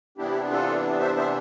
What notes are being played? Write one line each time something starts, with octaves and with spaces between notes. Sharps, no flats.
C3 E3 B3 D4 E4 G4
F4 A4
C5 E5
C5 E5